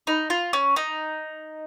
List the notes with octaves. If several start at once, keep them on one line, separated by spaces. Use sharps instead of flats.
D#4
F4
C#4
D#4